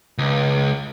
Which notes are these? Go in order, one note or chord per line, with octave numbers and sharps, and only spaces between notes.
C#2